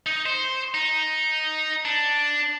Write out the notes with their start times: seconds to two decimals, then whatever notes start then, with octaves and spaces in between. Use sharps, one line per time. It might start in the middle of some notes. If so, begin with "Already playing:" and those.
0.06 D#4
0.26 C5
0.74 D#4
1.85 D4